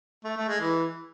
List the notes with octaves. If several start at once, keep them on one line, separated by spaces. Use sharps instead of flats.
A3
A3
G#3
E3